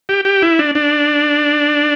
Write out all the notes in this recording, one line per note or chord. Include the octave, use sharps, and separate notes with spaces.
G4
G4
E4
D4
D4